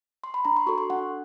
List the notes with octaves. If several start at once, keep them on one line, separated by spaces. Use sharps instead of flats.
C6
B5
D4 A#5
C6
F#4 A4 C#6
C6
D4 F#5